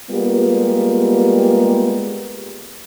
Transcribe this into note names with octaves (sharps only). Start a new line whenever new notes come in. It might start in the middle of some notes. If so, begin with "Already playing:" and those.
G3 G#3 A#3 B3 F4 G4